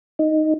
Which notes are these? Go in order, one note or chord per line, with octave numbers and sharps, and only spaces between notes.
D#4